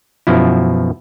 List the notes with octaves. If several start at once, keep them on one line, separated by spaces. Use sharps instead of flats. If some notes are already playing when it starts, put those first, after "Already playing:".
F#2 B2 F3 E4